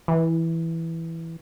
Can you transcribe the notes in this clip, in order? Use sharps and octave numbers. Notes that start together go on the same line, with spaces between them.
E3